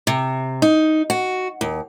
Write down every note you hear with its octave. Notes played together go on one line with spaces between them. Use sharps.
C3
D#4
F#4
D#2